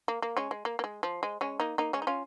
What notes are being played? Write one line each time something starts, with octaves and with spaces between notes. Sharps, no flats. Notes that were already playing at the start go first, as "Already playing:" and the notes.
A#3
A#3
G#3 C#4
G#3
A#3
A#3
G#3
F3
G#3
G#3 C#4
A#3 D#4
A#3 D#4
G#3 C#4
D#4
C#4 F4